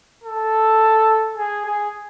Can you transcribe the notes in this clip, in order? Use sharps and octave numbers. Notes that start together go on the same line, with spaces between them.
A4
G#4
G#4